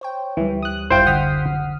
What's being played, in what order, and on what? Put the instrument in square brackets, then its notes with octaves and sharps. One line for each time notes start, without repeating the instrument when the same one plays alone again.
[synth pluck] C5 C#5 G5
[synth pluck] D2 G3 [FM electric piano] E3
[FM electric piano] D#6 F#6
[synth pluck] G#1 F#2 G3 [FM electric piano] E4 F4 [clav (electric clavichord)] C5 G5
[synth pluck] D3 B6 C7 [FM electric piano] F#5 D#6 F6